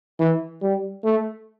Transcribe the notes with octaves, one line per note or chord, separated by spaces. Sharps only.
E3
G3
A3